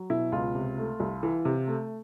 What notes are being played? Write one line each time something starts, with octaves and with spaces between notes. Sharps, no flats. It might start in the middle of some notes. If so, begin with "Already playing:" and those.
Already playing: F#3
B2 E4
C#2 F4
C3
A3
C2
E3
C3
A3